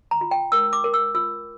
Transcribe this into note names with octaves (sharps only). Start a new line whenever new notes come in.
A#5
F4
G5
A#4 E6
D6
A#4
E6
F4 E6